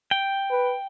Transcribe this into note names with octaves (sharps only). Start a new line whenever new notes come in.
G5
B4